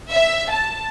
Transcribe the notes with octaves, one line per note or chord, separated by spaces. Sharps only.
E5
A5